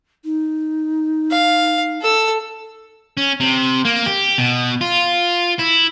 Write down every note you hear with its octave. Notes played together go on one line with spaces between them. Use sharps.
D#4
F5
A4 E6
C#4
C3
A#3
G4
B2
F4
E4